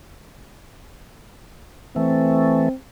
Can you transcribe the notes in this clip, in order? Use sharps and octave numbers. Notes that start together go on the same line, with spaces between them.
E3 A3 C4